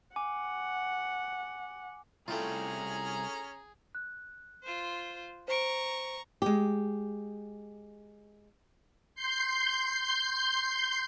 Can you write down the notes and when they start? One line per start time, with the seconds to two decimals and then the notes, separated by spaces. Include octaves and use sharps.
0.16 F#5 G#5 D6
2.28 C2 A3 C#4 E4 F4 G#4 G5 A#5
3.95 F#6
4.63 F4 C5
5.48 C5 A#5 C#6 D7
6.42 G#3 G4
9.15 C6 G6 C7